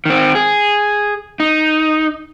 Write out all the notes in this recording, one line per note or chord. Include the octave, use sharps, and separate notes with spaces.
D#3 C4
G#4
D#4